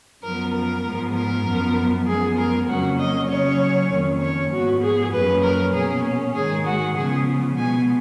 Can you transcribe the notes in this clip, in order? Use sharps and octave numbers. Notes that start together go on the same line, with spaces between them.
F#2 F3 B3 A#4
A#4
G#2 F3 G#3 B3
A#4
F#2 F3 B3
F#2 F3 G#3 B3 G#4
A#4
F2 C#3 F#3 A#3 C#4 F#4
D#5
C#3 F#3 C#4 C#5
F2 D#3 A#3 C#4
C#5
G#2 F3 B3 F#4
G#4
F#2 F3 A#3 C#4 B4
A#4
B2 A#3 C#4 G#4
G#2 D#3 G#3 G#4
F#4
C#3 F3 G#3 B3 G#4
B2 G#3 B3 G#5